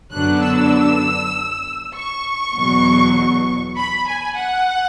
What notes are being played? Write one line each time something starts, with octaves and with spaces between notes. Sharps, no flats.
F#2 D3 F#3 B3 D4 F#6
E6
C#6
E2 B2 F#3
B5
G#5
F#5